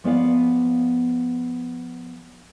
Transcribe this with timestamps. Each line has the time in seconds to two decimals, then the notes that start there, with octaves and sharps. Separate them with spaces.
0.04 F3 B3 D5 F5